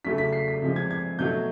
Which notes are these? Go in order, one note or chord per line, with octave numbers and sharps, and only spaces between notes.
C#3 F#3 A3 B6
B6
C7
B6
C3 F3 G#3
G#6
G#6
B2 F#3 A3 G6